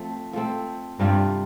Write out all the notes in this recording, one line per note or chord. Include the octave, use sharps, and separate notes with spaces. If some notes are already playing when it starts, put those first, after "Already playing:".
Already playing: F3 A3 C4
F3 A3 C4
G2 C3 G3 D4 F4